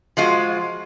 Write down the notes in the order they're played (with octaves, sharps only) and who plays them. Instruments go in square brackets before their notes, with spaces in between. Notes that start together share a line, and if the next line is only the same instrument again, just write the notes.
[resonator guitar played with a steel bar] F3 G#3 F4 F#4